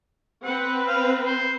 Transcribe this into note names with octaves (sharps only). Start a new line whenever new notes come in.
C4 B4 F#5
F5
C5